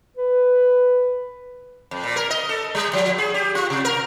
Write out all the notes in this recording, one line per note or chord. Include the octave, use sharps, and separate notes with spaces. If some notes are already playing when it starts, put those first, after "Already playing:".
B4
F2
A#2
A#4
D#5
A4
G3
F3
G#4
G4
F4
C3
A#4